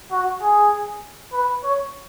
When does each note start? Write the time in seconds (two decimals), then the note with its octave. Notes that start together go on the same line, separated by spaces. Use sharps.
0.11 F#4
0.42 G#4
1.33 B4
1.63 C#5